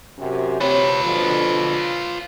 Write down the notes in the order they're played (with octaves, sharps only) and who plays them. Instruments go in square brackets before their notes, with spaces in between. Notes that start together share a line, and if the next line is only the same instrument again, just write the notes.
[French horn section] F#2 C3
[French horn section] C3 C#5 [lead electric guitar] F4 B4
[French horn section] B2 D3 F3